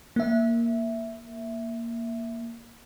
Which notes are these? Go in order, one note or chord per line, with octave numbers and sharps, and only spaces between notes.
A#3 E5